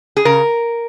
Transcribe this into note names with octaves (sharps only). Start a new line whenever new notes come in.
G#4
C#3 A#4